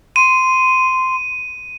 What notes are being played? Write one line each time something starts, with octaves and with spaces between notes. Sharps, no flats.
C6 D#7